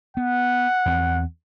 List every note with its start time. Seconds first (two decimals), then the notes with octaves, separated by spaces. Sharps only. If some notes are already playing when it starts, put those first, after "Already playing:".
0.17 B3 F#5
0.86 E2 C4